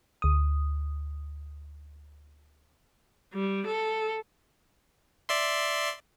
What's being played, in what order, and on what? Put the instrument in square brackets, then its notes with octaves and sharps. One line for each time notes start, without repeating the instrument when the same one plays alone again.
[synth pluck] D2 D#6
[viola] G3
A4
[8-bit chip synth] D5 E5 C6